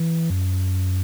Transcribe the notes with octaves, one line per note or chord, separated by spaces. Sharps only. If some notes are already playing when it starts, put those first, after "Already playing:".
Already playing: E3
F#2